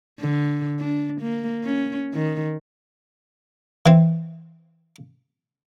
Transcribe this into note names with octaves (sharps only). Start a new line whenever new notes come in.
D3
D4
A#3
C#4
D#3
E3 C4